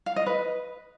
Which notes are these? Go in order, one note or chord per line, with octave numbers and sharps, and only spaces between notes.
F5
D#5
B4